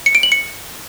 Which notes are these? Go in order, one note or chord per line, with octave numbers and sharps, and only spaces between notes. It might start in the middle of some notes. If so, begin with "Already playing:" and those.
C#7
D7
F#7
C#7